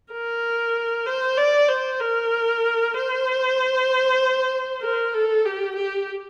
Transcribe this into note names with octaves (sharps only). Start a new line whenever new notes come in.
A#4
C5
D5
C5
A#4
C5
A#4
A4
G4
G4